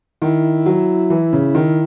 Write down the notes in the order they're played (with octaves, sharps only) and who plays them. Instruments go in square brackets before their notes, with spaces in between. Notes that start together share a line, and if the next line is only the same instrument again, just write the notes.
[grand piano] D#3 [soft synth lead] E4
[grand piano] F#3
E3
C#3
D#3